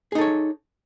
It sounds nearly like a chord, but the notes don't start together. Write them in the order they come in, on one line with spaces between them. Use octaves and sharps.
G#4 D#4 A4 C#5